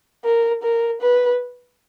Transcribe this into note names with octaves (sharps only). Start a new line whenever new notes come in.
A#4
A#4
B4